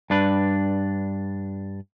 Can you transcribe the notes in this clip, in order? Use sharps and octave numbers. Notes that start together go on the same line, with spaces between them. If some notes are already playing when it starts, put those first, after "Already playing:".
G2 D4 B4